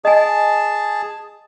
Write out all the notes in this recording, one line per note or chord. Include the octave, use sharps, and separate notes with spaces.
G#4 D#5 G#5 A5